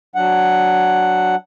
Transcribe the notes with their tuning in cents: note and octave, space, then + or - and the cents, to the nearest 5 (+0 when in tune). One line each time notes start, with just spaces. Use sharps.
F#3 +0 D4 +0 F#5 +0